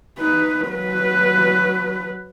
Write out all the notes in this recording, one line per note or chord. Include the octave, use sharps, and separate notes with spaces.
D#4 B4
F#3 B4